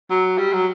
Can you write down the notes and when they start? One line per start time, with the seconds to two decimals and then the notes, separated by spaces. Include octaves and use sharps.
0.10 F#3
0.38 G3
0.53 F#3